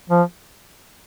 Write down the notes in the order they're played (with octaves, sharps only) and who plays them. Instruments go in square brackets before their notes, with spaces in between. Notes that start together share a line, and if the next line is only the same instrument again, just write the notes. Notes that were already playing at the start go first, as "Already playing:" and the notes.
[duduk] F3